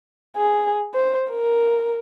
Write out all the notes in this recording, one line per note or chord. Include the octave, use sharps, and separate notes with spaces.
G#4
C5
A#4